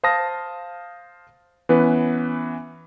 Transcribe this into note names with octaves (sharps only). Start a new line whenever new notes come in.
C5 F5 A5 D#6 F6 A#6
E3 B3 C#4 B4